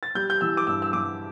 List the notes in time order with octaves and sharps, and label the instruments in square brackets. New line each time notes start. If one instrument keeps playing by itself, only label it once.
[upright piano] A6
G3 G6
G6
E3 E6
D6
G2 E6
E6
G2 D6